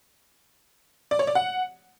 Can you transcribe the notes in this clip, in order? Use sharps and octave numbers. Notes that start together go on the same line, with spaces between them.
D5
C#5
D5
F#5